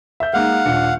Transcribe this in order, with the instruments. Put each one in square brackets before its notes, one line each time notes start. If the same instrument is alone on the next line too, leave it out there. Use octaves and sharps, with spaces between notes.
[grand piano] E5 G6
[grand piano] G#3 A#3 D#4 [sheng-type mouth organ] F5 F#5
[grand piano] D#1 D4 C#7